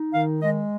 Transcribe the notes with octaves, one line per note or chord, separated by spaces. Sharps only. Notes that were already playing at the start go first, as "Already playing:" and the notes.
Already playing: D#4
D#3 F5
G#3 D#5